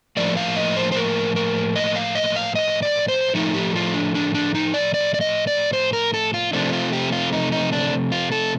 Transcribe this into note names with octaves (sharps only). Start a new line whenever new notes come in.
A2 F3 A#3 D5
F5
D#5
C5
C5
A#4
A#4
D#5
F5
D#5
F5
D#5
D5
C5
A2 F3 A3 D#4
G4
F4
D4
D4
D4
D#4
D5
D5
D5
D#5
D5
C5
A#4
A4
F4
C3 F3 A3 D4
F4
G4
F4
D#4
D#4
D4
F4
A4